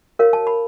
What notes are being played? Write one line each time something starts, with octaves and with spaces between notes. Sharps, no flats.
F#4 A#4 C#5 F5
A5
B5